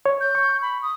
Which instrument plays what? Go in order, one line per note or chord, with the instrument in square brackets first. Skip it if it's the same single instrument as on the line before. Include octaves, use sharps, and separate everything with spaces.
[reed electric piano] C#5
[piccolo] G6
[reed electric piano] C#6
[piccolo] B5
D#6